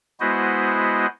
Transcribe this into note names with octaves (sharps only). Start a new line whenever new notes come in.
G#3 B3 E4 F#4 C5 D#5